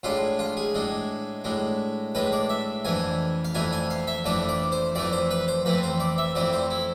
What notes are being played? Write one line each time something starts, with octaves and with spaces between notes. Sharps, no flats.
A2 G#3 D4 F4
F4
G#4
A2 G#3 D4
A2 G#3 D4
A2 G#3 D4 B4
D5
E5
F2 E3 A3 D4 G#5
F5
F2 E3 A3 D4 G#5
G#5
F5
E5
F2 E3 A3 D4 D5
D5
C5
F2 E3 A3 D4 D5
C5
B4
C5
F2 E3 A3 C4 B4
C5
D5
E5
F2 E3 A3 C4 D5
C5
E4